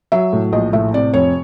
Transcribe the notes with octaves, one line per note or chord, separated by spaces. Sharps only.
F#3 E5
A2
A#1 D#5
A2 E5
C3 D5
F1 C#5